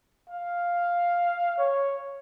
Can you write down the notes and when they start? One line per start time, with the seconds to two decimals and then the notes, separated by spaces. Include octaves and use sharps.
0.30 F5
1.58 C#5